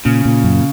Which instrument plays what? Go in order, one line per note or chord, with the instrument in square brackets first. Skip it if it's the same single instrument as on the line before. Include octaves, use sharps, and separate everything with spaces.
[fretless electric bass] A#2 [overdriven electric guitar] C#3
[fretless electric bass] A#2
F#2